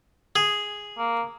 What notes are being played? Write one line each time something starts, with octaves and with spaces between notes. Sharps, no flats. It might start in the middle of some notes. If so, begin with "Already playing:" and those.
G#4
A#3